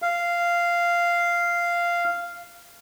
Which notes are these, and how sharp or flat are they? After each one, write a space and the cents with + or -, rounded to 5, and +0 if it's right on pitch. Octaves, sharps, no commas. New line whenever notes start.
F5 -10